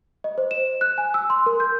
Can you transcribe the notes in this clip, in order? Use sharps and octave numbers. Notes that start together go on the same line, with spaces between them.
D#5
C5
E7
F#6
G#5
E6
C6
A#4
G6